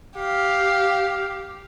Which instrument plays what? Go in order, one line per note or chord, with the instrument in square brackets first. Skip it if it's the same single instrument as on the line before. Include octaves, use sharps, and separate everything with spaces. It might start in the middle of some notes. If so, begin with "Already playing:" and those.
[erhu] G4 [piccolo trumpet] F5